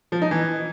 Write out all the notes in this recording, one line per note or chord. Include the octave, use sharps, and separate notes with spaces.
F3
D#4
E3